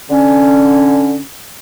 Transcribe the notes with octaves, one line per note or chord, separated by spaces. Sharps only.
D3 C#4